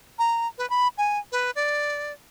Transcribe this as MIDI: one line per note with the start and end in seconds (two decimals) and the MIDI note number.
0.19 0.48 82
0.58 0.69 71
0.70 0.88 83
0.98 1.19 80
1.32 1.51 71
1.56 2.12 74